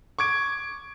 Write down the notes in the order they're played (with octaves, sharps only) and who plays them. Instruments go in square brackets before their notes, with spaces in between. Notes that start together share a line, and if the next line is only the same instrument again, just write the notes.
[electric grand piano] C#6 D6 G#6 D7